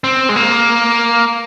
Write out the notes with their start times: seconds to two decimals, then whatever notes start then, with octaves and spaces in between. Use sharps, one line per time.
0.04 C4
0.29 G#3
0.36 A#3